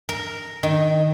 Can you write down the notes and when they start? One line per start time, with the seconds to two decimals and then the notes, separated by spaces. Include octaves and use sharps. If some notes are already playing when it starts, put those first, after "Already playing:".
0.09 A#4
0.63 D#3